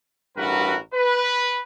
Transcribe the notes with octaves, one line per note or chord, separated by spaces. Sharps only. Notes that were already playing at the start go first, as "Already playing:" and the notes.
A1 G2 F#4 A#4 B4 F#5
B4